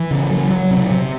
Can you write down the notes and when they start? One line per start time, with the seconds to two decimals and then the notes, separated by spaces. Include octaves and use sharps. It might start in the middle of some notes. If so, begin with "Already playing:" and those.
Already playing: E3
0.11 C#3
0.31 F#3
0.51 F#3
0.71 C3
0.91 C3